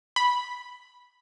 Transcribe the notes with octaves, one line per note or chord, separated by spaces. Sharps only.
B5